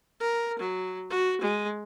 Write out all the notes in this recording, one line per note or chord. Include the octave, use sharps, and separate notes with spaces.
A#4
F#3
F#4
G#3